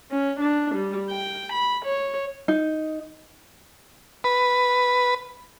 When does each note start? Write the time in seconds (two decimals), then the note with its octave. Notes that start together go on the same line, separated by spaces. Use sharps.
0.11 C#4
0.40 D4
0.75 G3
1.10 G5
1.53 B5
1.85 C#5
2.48 D#4
4.24 B4